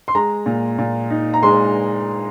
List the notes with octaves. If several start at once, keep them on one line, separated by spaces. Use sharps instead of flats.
C6
G#3 A#5
A#2
A#2
D#4
A#5
G#3 C6